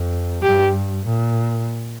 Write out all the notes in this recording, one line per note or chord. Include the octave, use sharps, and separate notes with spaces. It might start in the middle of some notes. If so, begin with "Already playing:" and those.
Already playing: F2
G2 G4
A#2